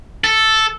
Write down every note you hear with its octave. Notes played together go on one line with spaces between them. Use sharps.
A4